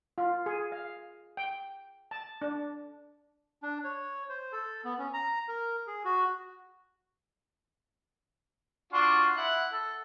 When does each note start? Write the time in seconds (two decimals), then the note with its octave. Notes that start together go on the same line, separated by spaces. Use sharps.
0.18 F4
0.46 G#4
0.72 F5
1.37 G5
2.11 A5
2.41 D4
3.63 D4
3.84 C#5
4.29 C5
4.52 A4
4.85 B3
4.99 C#4
5.13 A#5
5.48 A#4
5.87 G#4
6.05 F#4
8.93 D4 F4 F#4
9.36 E4 F#5
9.73 A4